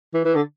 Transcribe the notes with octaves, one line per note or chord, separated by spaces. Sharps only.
E3
E3
D3